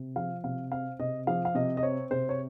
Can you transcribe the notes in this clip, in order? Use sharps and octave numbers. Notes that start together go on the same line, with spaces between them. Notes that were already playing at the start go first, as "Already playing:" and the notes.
Already playing: C3
F3 F5
C3 F5
C4 F5
C3 D#5
F3 F5
F5
C3 D#5
D#5
C4 C#5
C3 C5
C#5